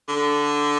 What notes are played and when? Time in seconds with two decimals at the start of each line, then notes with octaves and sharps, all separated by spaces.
0.08 D3